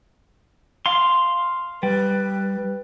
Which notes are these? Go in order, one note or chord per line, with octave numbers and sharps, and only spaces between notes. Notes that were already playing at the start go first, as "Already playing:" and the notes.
F5 C6
G3 B4